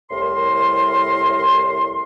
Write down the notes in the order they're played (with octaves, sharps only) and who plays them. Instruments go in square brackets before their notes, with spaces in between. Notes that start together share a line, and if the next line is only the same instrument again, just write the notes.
[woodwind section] C2 A2 A#4 C6